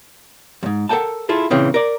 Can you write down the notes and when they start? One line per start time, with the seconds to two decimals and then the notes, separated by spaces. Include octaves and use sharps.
0.63 F2 G#2
0.89 A4 A#4 F#5 G5 A5
1.29 E4 F4 G#4 A4
1.50 A#2 C#3 E3 C4
1.74 A#4 D5